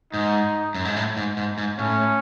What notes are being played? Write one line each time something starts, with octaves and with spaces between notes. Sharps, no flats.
G#2 D#4
F#2
G#2
A2
G#2
G#2
G#2
A2 C#4